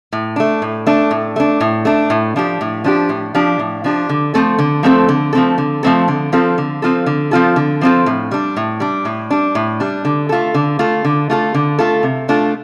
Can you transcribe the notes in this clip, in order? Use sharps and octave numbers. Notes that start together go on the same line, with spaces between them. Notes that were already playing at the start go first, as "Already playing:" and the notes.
A2
A3 D4
A2
A3 D4
A2
A3 D4
A2
A3 D4
A2
F3 D4 G4
A2
F3 D4 G4
A2
F3 D4 G4
A2
F3 D4 G4
D3
F3 A3 C4 A4
D3
F3 A3 C4 A4
D3
F3 A3 C4 A4
D3
F3 A3 C4 A4
D3
F3 C4 F4 A4
D3
F3 C4 F4 A4
D3
F3 C4 F4 A4
D3
F3 C4 F4 A4
A2
G3 D4
A2
G3 D4
A2
G3 D4
A2
G3 D4
D3
A3 F4 A4
D3
A3 F4 A4
D3
A3 F4 A4
D3
A3 F4 A4
C3
A3 D4 F4 A4